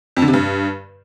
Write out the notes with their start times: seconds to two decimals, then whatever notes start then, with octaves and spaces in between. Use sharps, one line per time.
0.17 F2
0.22 D3
0.28 C3
0.33 G2